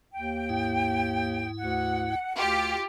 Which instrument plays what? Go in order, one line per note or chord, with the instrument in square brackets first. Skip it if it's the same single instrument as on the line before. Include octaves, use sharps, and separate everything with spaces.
[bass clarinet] D#2 [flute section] G5
[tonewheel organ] G#2 E4
[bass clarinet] D2 [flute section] F#5
[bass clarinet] D2 [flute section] F4 [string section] G4